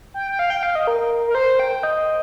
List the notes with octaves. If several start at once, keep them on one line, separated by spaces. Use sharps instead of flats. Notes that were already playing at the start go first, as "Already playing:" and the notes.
G5
G5
F5
G5
F5
D#5
A#4
A#4
C5
G5
D#5